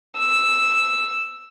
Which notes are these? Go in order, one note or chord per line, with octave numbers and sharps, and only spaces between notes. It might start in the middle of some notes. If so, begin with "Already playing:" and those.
E6